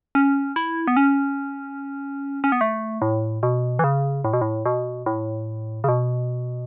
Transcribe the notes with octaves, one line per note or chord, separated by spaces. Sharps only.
C#4
E4
B3
C#4
C#4
B3
A3
A2
B2
E3
C#3
A2
B2
A2
B2
A2
C#3
B2